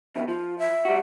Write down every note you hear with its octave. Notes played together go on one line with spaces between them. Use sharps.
F2 B2 D#3 E5
F3 F4
E5
G3 F#4